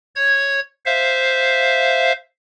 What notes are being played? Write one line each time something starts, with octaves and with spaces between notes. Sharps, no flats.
C#5 G#6
C5 E5 F5